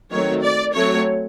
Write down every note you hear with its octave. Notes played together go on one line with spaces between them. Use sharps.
D#3 F#3 A3 C4 C#5
D5
F#3 A3 C4 C#5